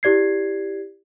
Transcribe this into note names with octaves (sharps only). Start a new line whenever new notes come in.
E4 G4 D5 G#6 C7